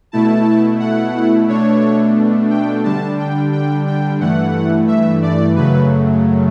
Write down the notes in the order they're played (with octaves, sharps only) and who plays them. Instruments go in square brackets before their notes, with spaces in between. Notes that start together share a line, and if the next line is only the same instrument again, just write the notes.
[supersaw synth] B2 A3 E4 A5
F#5
B2 A3 D4 C#5
G5
D3 G3 D4 A5
G5
G5
G5
G2 E3 A3 F#5
E5
D5
F#2 C#3 F#3 A3 B4